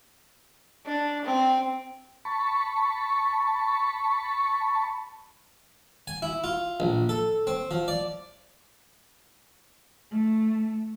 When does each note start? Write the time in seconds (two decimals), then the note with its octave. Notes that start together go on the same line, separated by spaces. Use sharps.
0.87 D4
1.25 C4
2.25 A5 B5 C#6
6.07 G#5
6.22 E4
6.44 F4
6.80 A#1
7.09 A4
7.47 C4
7.71 F3
7.88 D5
10.11 A3